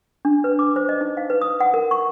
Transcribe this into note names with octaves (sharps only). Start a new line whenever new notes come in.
D4
B4
D6
C5
D#5
D#4
F5
B4
D#6
F#5
A#4
C#6